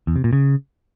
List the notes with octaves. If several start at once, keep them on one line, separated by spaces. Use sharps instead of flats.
E2
C3
A#2
C#3